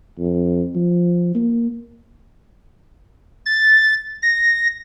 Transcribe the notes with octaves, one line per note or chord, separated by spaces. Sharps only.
F2
F3
A#3
A6
A#6